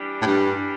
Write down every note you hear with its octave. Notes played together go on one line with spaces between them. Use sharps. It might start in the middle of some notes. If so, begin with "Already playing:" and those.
Already playing: E3 G3 D4 G4
A2
G2